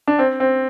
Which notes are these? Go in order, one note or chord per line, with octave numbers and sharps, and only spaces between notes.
D4
C4
C4